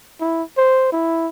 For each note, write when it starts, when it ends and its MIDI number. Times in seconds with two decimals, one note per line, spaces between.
0.21 0.43 64
0.57 0.88 72
0.92 1.28 64